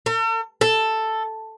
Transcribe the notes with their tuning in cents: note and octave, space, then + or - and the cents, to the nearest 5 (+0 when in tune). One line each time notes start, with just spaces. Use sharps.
A4 +45
A4 +5